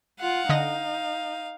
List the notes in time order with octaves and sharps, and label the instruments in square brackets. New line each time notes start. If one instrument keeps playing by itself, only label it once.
[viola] F4 F#5 [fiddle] F5
[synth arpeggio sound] D3 D#5 A#6 [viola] D#4